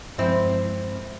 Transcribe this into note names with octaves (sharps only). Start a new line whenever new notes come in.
G2 F3 G#3 C4 E4